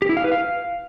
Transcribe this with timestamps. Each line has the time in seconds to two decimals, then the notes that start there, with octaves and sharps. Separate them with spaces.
0.02 G4
0.09 E4
0.17 F5
0.24 B4
0.32 F5